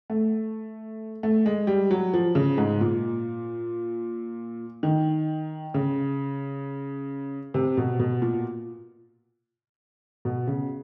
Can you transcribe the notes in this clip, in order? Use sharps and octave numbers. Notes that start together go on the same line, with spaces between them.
A3
A3
G#3
G3
F#3
F3
C#3
G#2
A#2
D#3
C#3
C3
B2
B2
A#2
B2
C#3